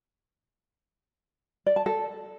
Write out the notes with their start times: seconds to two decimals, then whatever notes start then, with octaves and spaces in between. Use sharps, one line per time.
1.66 D5
1.76 A5
1.86 A4